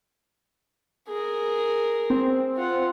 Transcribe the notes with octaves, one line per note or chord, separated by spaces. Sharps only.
G#4 A#4
C4
F4 F#5